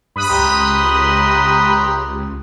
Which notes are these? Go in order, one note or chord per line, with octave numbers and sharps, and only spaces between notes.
G2 B5 D#6 F#6
C#2 G4 A#5 C6